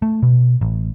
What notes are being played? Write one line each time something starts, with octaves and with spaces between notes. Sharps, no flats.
A3
B2
A1